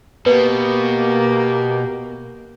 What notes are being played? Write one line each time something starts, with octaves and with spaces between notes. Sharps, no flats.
B2 A#3 G4 B4